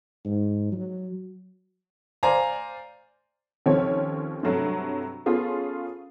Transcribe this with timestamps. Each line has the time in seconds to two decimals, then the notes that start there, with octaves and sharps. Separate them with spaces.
0.25 G#2
0.72 F#3
2.23 C5 D5 F5 G#5 A#5
3.66 D#2 F3 C4 C#4 A4 C#5
4.43 G2 C3 F#3 A3
5.26 B3 C#4 F4 G#4 A4